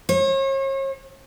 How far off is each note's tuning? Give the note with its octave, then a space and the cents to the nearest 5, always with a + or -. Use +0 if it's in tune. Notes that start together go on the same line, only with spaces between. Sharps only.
C#5 -40